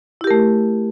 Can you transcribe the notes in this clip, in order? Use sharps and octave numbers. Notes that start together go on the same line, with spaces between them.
A3 E4 G4 A#4